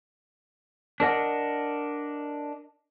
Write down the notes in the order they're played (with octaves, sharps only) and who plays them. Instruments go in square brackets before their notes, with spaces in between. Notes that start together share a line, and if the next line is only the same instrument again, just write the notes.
[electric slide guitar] D4 A#4 D#5 F#5